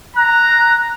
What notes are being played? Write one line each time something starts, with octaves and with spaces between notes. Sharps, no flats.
A#5 F#6